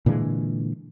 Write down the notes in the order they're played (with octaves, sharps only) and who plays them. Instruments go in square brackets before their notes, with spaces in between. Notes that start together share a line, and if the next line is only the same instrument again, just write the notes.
[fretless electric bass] A#2 D3 E3 G#3